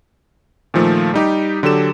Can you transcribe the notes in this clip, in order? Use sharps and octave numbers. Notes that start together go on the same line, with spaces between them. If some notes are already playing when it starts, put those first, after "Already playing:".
A#2 D#3 F3 A3
G3 D#4 G4
D3 F#3 G4 A4 E7